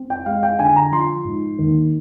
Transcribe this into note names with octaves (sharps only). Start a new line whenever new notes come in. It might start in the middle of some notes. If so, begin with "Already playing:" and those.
Already playing: C4
G5
G#3 F5
G5
D3 G#5
A#5
F3 C6
G#2
D#2